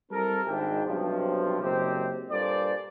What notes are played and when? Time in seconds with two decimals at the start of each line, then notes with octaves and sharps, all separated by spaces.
0.11 G3 C4 E4 A4 A#4
0.46 G#1 G#2 G#3 D4 E4 G5
0.84 B1 G2 C3 F3
1.61 F#1 C3 G#3 C4 G4
2.30 G2 A#2 A4 C5 D5